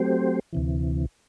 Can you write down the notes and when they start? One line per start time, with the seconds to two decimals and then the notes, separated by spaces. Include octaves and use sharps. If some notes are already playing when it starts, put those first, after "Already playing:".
Already playing: F#3 A3 C4 G4 C5
0.53 D2 C3 E3